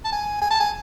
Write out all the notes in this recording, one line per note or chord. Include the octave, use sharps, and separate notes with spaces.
A5
G#5
G#5
A5
G#5